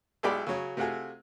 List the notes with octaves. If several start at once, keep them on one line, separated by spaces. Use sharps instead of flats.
B1 G#3 E4 G4 D5 B5
C#3 F#3
C3 A3 F4 F#4 G#4